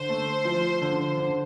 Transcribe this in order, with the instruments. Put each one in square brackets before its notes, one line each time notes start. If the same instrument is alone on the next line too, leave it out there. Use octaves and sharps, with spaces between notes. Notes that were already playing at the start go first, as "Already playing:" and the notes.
Already playing: [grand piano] D3 [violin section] C5
[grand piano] A3
F3
D3
D3